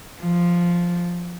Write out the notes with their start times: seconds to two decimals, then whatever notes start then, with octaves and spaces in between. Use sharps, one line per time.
0.22 F3